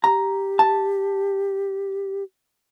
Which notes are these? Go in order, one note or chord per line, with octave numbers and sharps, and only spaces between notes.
G4 A#5
A5